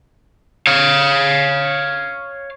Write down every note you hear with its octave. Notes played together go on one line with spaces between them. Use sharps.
C#5 F5